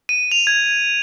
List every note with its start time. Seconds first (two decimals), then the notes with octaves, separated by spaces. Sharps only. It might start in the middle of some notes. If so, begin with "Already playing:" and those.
0.09 D#7
0.32 F7
0.47 G#6